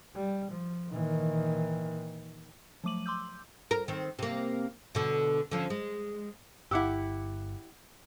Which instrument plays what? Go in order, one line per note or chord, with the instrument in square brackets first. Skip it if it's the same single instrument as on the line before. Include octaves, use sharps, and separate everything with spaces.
[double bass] G3
F3
[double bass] A#2 E3 [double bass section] D#3
[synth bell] F3 F#3 A3 D6 D#7 F#7
C6 D6 E6 G6
[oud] A#4
D#3 C4
C3 A#3
B2 D3
D3 F3 C#4
G#3
[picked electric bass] G1 [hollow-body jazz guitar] E4 G4 [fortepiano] F#5 D6 E6